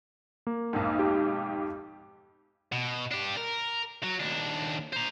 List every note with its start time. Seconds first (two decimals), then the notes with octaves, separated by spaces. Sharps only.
0.47 A#3
0.73 B1 F2 G#2
0.99 G4
2.72 B2
3.12 D4 G4
3.37 A#4
4.03 F#3
4.19 D#2 D4
4.93 C5 A#5